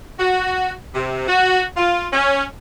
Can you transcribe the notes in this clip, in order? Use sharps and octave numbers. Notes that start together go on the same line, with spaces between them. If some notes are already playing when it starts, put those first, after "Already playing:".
F#4
C3
F#4
F4
C#4